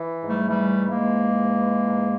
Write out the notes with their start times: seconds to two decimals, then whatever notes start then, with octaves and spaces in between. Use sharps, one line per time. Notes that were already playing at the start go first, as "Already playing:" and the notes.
Already playing: E3
0.21 G#2
0.27 G3 A3
0.47 E3 G3 A3
0.75 G#2
0.88 G#3 A#3
1.02 E3
1.29 G#2
1.56 E3
1.84 G#2